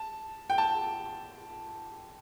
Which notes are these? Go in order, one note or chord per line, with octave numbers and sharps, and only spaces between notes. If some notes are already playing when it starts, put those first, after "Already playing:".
Already playing: A5
G5
A5